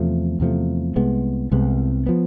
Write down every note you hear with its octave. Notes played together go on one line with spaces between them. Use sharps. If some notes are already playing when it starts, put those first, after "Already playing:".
Already playing: E2 C3 F3 A3
E2 C3 F3 A3
C2 C3 G#3 B3
C2 C3 G#3 B3
F3 B3